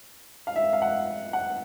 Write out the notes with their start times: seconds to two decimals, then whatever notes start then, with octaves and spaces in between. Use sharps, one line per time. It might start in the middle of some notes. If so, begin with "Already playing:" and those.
0.47 F5
0.56 E5
0.73 F5
0.82 F#5
1.33 F#5